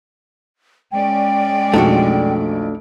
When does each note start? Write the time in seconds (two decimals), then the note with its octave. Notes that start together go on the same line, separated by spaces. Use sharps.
0.92 G#3 C#4 D5 G5
1.74 B1 F2 A3 D4 F#4 G#4